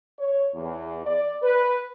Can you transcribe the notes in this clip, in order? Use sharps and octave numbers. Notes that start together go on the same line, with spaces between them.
C#5
E2
D5
B4